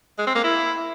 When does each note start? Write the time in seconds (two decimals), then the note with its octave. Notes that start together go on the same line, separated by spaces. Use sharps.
0.19 G#3
0.27 C4
0.36 A#3
0.44 E4